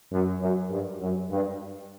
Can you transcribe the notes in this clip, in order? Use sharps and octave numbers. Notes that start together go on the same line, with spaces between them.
F#2
F#2
G2
F#2
G2